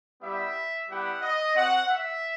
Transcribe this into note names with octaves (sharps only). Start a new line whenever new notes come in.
G3 B3 E4 G4 E5
G3 B3 E4 G4 F#5
D#5
C4 F#4 F#5
E5